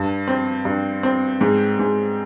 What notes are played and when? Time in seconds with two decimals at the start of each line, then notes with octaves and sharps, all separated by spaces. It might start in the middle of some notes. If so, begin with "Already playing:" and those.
Already playing: G2
0.27 C4
0.65 G2
1.03 C4
1.41 G#2
1.79 G#2